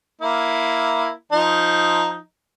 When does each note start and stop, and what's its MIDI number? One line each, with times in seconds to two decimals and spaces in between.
0.21 1.11 58
0.21 1.11 64
1.32 2.18 53
1.32 2.18 63